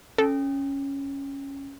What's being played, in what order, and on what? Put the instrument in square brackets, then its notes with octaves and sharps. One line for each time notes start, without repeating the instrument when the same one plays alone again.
[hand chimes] C#4 [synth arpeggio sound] A4